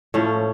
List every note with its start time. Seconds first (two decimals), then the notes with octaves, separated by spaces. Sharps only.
0.14 A2 F3 C#4